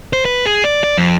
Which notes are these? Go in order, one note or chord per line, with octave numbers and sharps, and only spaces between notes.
C5
B4
G#4
D5
D5
F2